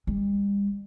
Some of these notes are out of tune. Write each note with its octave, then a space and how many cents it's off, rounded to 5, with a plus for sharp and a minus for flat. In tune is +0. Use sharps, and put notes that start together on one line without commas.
G3 +40